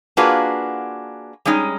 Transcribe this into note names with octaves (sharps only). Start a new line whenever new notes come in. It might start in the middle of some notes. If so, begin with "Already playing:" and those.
A#3 D4 F4 F#4 G#4 B4
G3 G#3 C#4 D#4